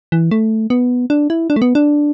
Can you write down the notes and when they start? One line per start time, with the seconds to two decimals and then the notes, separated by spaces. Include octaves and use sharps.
0.12 E3
0.31 A3
0.70 B3
1.10 D4
1.30 E4
1.50 D4
1.56 A3
1.62 B3
1.75 D4